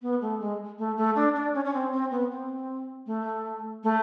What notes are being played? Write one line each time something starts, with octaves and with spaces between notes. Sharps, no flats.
B3
A3
G#3
A3
A3
D4
D4
C#4
C#4
C4
C4
B3
C4
A3
A3